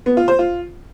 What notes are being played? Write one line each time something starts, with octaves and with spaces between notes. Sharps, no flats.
B3
F4
C5
F4